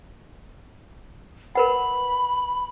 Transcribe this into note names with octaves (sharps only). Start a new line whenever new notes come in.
A#4 B4 F#5 B5